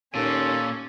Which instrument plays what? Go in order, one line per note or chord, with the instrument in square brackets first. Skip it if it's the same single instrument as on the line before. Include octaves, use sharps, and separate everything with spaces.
[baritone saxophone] D#2 [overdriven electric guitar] A#2 [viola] C#4 [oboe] A4